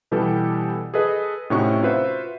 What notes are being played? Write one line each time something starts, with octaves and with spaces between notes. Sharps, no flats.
B2 E3 G3 G4 A4 B4
G#4 A4 B4 D#5
A2 C3 C#4 D#4 F#4 C#6
F4 F#4 B4 C5 E5